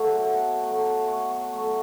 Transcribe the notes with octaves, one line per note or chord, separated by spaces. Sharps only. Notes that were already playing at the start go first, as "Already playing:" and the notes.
Already playing: F#3 A3 F#4 A4
B2
F#3 A3
B2 C#5
C#5
F#3 A3 C#5